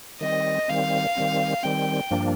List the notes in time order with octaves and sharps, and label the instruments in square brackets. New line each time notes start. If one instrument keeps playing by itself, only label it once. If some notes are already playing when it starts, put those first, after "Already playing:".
[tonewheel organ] D#3 G3 C4 [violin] D#5
[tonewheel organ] D#3 G3 C4 [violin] F5
[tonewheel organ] D#3 G3 C4
[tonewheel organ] D#3 G3 C4 [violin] G5
[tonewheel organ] G2 F3 A#3 D4